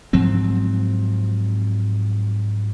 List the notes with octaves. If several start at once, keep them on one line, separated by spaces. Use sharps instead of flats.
G#2 F3 F#3 C4